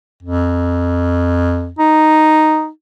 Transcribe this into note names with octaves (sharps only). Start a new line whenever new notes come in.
F2
D#4